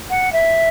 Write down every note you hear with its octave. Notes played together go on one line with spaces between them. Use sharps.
F#5
E5